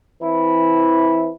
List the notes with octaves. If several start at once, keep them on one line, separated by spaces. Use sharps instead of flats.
E3 C4 E4